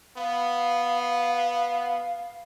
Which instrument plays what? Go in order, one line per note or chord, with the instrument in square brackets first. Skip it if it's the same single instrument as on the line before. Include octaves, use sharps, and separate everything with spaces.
[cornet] B3 [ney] F5